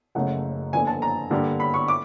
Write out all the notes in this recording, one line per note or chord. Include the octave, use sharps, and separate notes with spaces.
F#1 F#2 C#3 F3 A3 F#5
G1 G2 D3 F3 A#3 G#5
A5
A#5
G2 D3 G3 A#3 D4
B5
C#6
D6